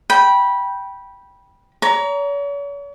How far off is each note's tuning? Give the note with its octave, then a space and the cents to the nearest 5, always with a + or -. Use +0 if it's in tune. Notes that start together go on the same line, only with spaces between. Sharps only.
G5 +0 B5 -15
C#5 +40 A#5 +10